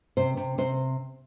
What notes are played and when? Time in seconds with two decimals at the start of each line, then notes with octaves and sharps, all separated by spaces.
0.17 C3 C5
0.37 C3
0.58 C3 C5